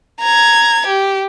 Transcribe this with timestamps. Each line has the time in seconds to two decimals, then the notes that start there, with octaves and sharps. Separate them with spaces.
0.21 A#5 G#6
0.87 G4